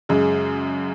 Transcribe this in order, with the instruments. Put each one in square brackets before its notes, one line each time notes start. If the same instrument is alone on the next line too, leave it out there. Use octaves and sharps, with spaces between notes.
[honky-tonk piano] F#2 C#3 G#3